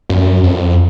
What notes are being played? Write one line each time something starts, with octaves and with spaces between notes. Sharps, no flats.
F#2
F2